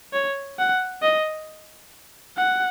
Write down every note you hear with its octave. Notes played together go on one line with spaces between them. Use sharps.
C#5
F#5
D#5
F#5